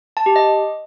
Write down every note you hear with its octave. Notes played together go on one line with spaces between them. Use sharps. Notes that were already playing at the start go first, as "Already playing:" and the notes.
A5
G4
D#5